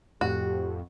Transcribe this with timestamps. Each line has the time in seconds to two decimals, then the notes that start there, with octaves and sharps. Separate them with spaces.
0.21 F2 A2 F#4 G4